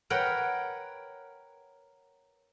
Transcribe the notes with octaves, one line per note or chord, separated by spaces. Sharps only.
A#4 B4 C#5 F#5 G5